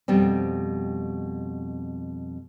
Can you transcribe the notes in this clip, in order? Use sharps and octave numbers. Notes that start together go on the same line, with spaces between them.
F2 B2 G3 C4